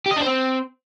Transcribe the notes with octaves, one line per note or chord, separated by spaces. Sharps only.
G4
D#5
D4
C5
C4